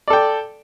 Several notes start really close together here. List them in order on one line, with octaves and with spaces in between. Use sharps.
D5 A4 G5